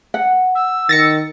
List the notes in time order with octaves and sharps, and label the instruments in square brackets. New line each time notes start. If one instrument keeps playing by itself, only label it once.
[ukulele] F#5
[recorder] E6
[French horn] D#3 [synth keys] A6 A#6 C#7